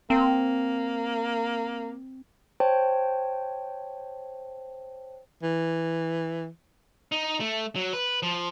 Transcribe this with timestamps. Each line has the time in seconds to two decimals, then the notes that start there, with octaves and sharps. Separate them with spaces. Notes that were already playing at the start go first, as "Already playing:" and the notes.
0.10 A#3 C4
2.60 C5 C#5 G5 A5
5.43 E3
7.12 D#4
7.40 A3
7.76 F#3
7.93 B4
8.23 F3